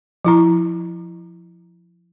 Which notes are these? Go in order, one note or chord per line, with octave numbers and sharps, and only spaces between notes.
F3 E4 A#5